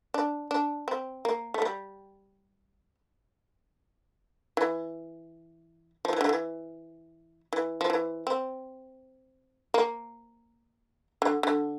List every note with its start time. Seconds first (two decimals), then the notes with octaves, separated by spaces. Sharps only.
0.14 D4
0.51 D4
0.88 C4
1.25 A#3
1.54 A3
1.62 G3
4.57 E3
6.05 F3
6.13 E3
6.21 D3
6.29 E3
7.53 E3
7.81 F3
7.90 E3
8.27 C4
9.74 A#3
11.22 D3
11.43 D3